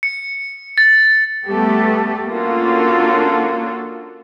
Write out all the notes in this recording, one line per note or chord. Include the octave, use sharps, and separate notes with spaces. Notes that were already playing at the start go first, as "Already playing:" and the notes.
C#7
A6
G3 A3 B3 G4 A4
A#3 C#4 D4 F4 F#4 A4